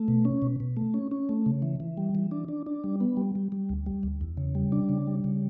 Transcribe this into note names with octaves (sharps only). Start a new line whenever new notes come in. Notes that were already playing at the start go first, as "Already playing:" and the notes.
Already playing: A3
B2
C#4
B2
B2
A3
C#4
C#4
A3
C#3
E3
E3
G3
E3
D4
D4
D4
G3
B3
G3
G3
G3
D2
G3
D2
E2
C#3
G3
D4
C#3
G3
C#3